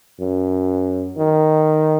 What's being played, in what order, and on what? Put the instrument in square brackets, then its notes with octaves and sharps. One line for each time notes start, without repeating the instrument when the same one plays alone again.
[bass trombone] F#2
D#3